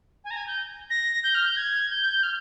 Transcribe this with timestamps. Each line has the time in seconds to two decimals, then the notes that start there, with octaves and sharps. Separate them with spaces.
0.24 G#5
0.31 A#5
0.36 G#5
0.47 G6
0.90 A#6
1.24 G6
1.35 F6
1.46 G6
1.57 G#6
1.90 G6
2.23 F6